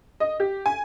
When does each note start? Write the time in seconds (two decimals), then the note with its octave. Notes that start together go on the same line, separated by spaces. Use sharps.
0.20 D#5
0.40 G4
0.66 G#5